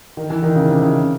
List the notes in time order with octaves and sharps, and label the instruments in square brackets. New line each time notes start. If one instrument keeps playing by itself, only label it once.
[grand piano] D#3
E3
D#3
C#3
C3
C#3